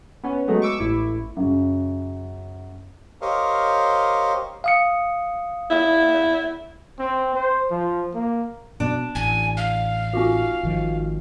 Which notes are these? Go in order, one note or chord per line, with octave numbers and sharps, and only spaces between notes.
B3 C#4
F#3 G#3 A3 B3
C#6 D6 E6
A1 E4
F#2 C#3
G4 A#4 C5 C#5 D#5 F5
F5 D#6 C#7
E4
C4
C5
F3
A#3
B2 B3 D4
A1 G#5
F5
C4 F4 F#4
G#1 D#3 F3